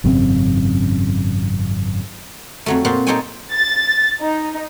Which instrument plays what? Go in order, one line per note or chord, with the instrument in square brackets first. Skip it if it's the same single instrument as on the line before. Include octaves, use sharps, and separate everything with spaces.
[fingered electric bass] G#1 F#2 C#3 C4
[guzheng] F2 F#3 A3
A#2 F4 F#4 C5
D#4 A4 C5 C#5 G5 G#5
[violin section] A6
D#4